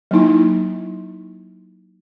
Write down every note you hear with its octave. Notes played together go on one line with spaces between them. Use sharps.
F#3 A#3 D#4 E4